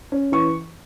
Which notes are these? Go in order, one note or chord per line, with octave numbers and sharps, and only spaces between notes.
C#4
E3 C#6